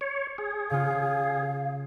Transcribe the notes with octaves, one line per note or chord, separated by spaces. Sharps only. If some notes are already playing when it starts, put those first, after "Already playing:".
C#5
G#4
C#3 F4 F5